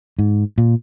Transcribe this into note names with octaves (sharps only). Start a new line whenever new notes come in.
G#2
A#2